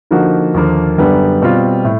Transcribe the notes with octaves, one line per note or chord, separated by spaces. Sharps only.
D3 F3 A#3 D#4 F#4
D#2 D3 F3 A#3
F#2 D3 G3 B3
B2 G3 C4 F4
A2